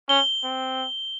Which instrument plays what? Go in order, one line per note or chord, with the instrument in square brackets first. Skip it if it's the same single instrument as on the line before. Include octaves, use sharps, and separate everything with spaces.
[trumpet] C#4 [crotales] G7
[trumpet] C4